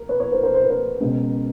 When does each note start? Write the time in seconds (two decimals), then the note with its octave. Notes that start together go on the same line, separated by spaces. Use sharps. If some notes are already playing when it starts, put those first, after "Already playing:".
Already playing: A#4
0.09 B4 C#5
0.20 B4 C#5
0.32 A#4 C5
0.43 A#4 C5
0.54 C5
0.62 B4
0.70 A#4 C5
1.00 C#2 B2 G#3 C#4